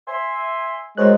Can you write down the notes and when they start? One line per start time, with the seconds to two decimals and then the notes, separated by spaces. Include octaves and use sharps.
0.08 E5 G#5 C6
0.97 F#2 G#3 C5 C#5 F#6